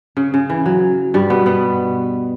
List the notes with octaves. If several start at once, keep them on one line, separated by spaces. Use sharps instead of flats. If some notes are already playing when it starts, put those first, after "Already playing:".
C#3
C#3
E3
F#3
G2 G3
B2 B3
B2 B3